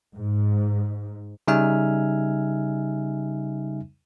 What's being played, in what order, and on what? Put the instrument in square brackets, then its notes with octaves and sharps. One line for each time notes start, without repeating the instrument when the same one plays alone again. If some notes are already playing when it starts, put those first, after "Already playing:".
[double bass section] G#2
[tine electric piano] C#3 G3 D#4 E5 G#5 F6